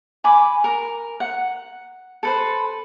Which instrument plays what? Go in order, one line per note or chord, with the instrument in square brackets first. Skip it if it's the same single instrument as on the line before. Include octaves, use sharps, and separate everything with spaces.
[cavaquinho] G#5 B5 D6
A#4
F#5
A4 B4 C5